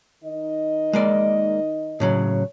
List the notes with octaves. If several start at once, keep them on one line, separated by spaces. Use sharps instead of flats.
D#3 D#4 D#5
G#3 A#3 D5
A2 C#3 F#3